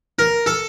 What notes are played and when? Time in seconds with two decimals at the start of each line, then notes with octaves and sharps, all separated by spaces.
0.19 A#4
0.46 A4